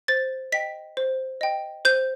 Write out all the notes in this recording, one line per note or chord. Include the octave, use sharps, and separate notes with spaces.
C5 A6
D#5 G5 B6
C5
D#5 G5
C5 G6